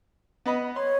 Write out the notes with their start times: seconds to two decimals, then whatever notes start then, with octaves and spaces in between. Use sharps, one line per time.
0.46 B3 D#5 B5
0.76 C#5 C6